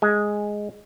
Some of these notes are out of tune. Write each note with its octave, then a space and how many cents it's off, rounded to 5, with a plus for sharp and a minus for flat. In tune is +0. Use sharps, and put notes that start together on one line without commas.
G#3 +0 G#5 +0